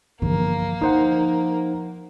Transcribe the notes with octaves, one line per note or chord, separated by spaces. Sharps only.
G1 E3 F3 A#3
F3 D#4 C5 F#5